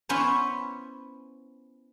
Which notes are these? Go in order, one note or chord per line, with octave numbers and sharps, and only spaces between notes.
B3 C#4 E4 B4 C5